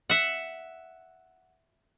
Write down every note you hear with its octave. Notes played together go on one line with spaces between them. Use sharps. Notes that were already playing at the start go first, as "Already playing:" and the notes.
E5 F#5